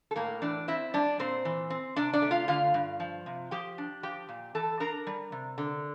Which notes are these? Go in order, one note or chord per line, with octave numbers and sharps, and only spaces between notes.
A4
A2 A#3 A#4
E3 D4 D5
C4 E4 E5
G3 D4 D5
A#2 C4 C5
E3
C4
C3 D4 D5
D4 D5
A3
F4 F5
D3 F4 F5
G2
F3
C3
F3 G4 G5
D4
F3 G4 G5
A#2
E3 A4 A5
D4 A#4 A#5
G3
C3
D3